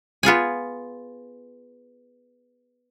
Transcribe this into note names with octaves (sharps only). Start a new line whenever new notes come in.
B3 F4 G#4 G#5